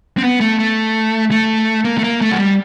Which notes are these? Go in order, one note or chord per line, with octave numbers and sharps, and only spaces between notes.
C4
B3
A3
A3
A3
A#3
A3
A#3
A3
F#3
G3